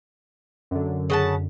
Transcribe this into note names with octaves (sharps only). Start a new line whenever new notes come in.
F#2 D3
C#3 F#5 A5